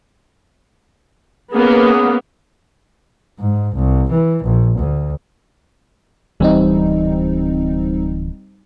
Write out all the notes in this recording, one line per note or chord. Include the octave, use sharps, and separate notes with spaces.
A#3 B3 C#4 G#4
G#2
C2
E3
A#1
D2
D1 E3 G3 C4 D#4